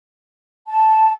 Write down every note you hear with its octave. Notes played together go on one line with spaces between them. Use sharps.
A5